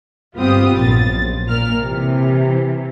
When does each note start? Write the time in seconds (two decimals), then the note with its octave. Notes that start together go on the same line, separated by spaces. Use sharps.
0.36 G1 B3 C4 F4 G4 D#6
0.74 A#1 F#2 A6
1.46 A#2 A#4 F6
1.80 C3 E3